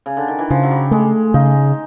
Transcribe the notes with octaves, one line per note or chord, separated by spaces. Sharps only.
C#3
D3
D#3
E3
C#3 F3
F#3
G3
G#3 A3
C#3 D#4